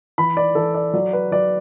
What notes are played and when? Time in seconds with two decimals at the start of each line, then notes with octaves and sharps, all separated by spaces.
0.18 E3 B5
0.37 D5
0.55 E3 A4
0.75 D5
0.93 F#3 D5
1.13 B4
1.32 F#3 D5